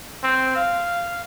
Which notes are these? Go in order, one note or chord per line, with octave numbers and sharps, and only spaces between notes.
C4
F5